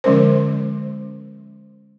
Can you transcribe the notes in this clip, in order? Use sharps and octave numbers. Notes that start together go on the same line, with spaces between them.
D3 F3 G#3 C#4 A#4 C5